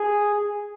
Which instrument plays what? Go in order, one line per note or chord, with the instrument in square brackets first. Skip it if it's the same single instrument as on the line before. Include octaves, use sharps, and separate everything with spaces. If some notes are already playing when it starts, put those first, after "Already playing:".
Already playing: [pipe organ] G#4